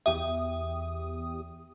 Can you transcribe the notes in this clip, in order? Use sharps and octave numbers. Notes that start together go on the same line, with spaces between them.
E2 G4 E5 D#6